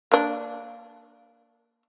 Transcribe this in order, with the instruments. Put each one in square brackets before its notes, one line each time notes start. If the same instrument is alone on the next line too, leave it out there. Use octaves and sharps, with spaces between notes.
[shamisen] A#3 D4